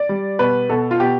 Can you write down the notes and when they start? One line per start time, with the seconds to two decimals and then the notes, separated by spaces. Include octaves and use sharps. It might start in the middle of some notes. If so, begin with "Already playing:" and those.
Already playing: D5
0.09 G3
0.39 B2 B4
0.69 B2 A4
0.91 F4
1.00 B2 G4